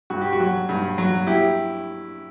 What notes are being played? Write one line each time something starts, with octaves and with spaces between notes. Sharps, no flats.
G2 F#4
G4
F#4
F#3
G2
F#3
E4 G4